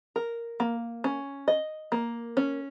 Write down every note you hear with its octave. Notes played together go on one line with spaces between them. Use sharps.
A#4
A#3
C#4
D#5
A#3
C#4